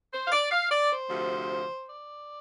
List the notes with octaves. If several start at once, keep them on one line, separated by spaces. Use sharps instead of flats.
C5
F5
D5
F5
D5
C5
D2 C3 F3
D5